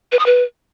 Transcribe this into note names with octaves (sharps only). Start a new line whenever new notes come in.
B4
D#6
B4